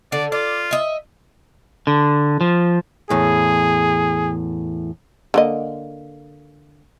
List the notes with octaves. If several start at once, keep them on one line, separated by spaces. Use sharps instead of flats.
D3 D5
F4 D5
D#5 E5
D3
F3
E2 A2 G#4
D3 A#3 D#5